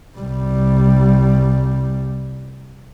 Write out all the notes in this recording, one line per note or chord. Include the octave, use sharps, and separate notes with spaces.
C2 G3